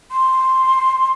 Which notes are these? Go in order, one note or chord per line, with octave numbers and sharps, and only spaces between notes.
C6